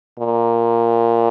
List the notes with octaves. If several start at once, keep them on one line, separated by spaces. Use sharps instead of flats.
A#2